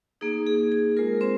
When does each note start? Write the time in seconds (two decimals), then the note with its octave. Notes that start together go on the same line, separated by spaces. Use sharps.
0.21 A#3 D#4 G#4
0.47 G#4
0.72 G#4
0.97 G#3 F4 A#4
1.21 C4 C5